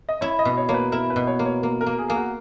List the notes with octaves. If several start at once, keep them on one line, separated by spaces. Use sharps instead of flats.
D#5
E4 C#5
D#5
B2
C#5
A#3 C#5
B4
E4 A#4
B4
B2
C#5
A#3
C#5
A#3
A#4
A#3
G#4
A#3 G#4
F#4